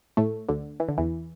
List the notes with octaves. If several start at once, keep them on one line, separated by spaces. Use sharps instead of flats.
A2 A3
D2 D3
E3
D3
E2 E3